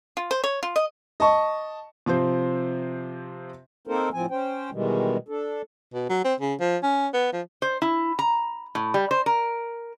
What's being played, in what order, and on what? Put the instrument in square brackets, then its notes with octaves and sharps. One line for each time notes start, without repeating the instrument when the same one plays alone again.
[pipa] F4
C5
C#5
F4
D#5
[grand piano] D#5 A5 C#6
[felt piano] C3 F3 C4 C5
[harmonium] A#3 C4 D#4 A4 A#4 C5
A2 F3 C4 G#5
C#4 C5 G5
B2 D#3 E3 G3 G#3
D4 A4
[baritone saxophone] B2
F#3
C4
C#3
F3
C#4
B3
F3
[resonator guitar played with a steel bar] C5
E4
A#5
A2
G3
C5
A#4